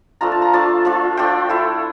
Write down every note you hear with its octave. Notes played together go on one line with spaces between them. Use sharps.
F3 A3 D4 F4 A#5
A5
A#5
F3 A3 D4 F4 A5
F3 A3 D4 F4
F3 A3 D4 F4 G5
A3 E4